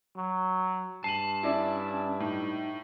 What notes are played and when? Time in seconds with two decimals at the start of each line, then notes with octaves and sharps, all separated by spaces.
0.17 F#3
1.04 G2 A5 C7 D#7 F#7
1.43 C#4 E4 D5 E5
2.20 A2 D#4